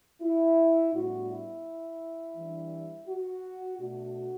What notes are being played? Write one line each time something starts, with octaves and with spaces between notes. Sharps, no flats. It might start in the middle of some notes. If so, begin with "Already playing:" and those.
E4
A2 G3 B3 D4 F#4
E4
E3 G3 D4
F#4
B2 A3 D4 F#4